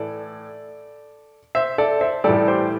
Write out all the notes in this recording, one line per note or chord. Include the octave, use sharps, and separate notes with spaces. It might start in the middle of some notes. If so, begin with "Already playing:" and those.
Already playing: A2 E3 A4 D5
C5 E5
A4 D5
C5 E5
A2 E3 G3 A4 D5
G4 C5